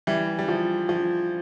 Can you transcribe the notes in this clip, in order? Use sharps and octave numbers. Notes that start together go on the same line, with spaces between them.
E3 G3
G3
F3
F3